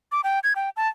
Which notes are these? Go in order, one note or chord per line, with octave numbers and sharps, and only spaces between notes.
D6
G5
G#6
G5
A5